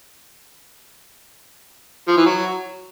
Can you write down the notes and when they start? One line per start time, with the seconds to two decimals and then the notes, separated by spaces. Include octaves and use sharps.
2.08 F3
2.17 E3
2.26 F#3